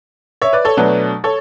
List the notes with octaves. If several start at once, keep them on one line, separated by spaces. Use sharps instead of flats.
C#5 E5
B4 D5
A4 C#5
B2 F#3 A3 D4 B4
A4 C#5